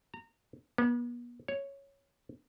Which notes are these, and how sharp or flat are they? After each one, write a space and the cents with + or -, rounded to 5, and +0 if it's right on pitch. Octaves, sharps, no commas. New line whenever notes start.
A#5 -25
B3 -40
C#5 +0